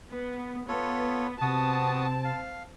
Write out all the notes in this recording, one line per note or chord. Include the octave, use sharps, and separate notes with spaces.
B3
B3 F4 A4 C#5
C3 B3 C4 F#4 A5 D#6
F5